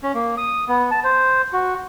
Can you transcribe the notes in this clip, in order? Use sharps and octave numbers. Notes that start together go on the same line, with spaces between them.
C#4
A#3
D#6
B3
A5
C5
F#4